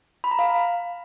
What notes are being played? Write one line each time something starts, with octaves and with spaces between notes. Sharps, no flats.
B5
A#5
F5